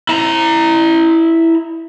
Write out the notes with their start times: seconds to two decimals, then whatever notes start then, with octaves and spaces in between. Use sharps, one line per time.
0.09 E4 A#5